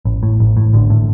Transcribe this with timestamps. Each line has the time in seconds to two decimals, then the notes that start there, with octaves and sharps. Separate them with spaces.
0.05 A1
0.23 A2
0.40 A1
0.57 A2
0.73 A1 D3
0.90 A2